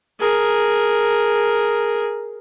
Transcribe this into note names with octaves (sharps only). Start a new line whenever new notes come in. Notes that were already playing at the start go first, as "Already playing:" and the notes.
G#4 A#4